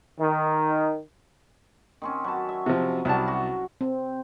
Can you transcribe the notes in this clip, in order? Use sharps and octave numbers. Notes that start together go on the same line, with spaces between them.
D#3
D#3 C4 C#4
F#3 B4 A5
E5
C3 F3
C2 F#3 G3 A5
F#4
C4